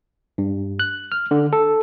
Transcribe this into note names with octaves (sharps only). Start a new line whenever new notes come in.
G2
F#6
F6
D3
A4